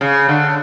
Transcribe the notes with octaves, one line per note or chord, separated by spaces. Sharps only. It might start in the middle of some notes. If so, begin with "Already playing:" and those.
C#3
D3